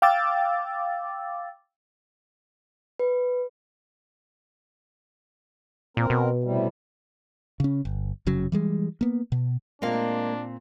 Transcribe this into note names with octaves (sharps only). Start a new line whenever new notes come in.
F5 G5 D6 E6 A6
B4
A#2 C4 A#4
B2
A2 C3 G3
C#3 C#4
G1
F1 C#3 F#3
E3 G3 G#3
A#3 B3
B2
A#2 G#3 A#3 C4 D4 F5